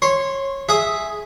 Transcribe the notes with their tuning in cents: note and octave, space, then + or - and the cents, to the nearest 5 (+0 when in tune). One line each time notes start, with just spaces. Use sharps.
C#5 -20 C6 +0
G#4 +5 E5 +0 D#6 +0